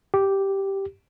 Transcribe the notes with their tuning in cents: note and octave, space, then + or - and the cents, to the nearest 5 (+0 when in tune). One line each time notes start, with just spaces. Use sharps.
G4 -5